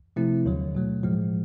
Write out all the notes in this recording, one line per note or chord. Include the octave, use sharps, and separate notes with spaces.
C3 F3 A3 C4 E4
D#2 D3 F#3
B2 F#3 A3
A2 F3 G#3